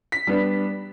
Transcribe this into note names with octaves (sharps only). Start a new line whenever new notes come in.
B6
G3 B3 D4